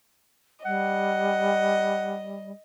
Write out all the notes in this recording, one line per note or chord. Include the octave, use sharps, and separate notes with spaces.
G3 D#5 F#5